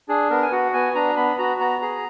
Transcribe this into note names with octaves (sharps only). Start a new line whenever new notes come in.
D4 G#4
B3 A#4
G#5
F#4 F#5
B3 G#5
D4 A#5
B3 B5
F#4 A#5
B3 A#5
G#4 A#5